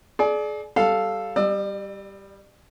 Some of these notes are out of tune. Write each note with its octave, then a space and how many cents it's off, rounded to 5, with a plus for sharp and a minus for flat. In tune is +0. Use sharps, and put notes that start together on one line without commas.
G#4 +40 D5 +5
G3 +0 A4 +0 F5 +0
G3 +0 D5 +40 E6 -5